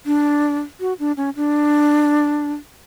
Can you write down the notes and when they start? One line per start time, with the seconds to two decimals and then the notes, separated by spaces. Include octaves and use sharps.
0.06 D4
0.80 F#4
0.99 D4
1.17 C#4
1.36 D4